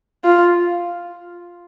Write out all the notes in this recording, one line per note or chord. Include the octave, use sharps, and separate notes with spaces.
F4